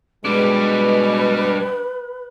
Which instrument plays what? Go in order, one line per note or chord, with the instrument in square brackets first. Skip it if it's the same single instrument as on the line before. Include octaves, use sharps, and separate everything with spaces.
[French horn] B2 [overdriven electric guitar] G3 D4 [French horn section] G#3 [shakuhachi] B4